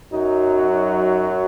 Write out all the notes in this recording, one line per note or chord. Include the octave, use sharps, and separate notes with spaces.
F#2 F#3 D#4
D#4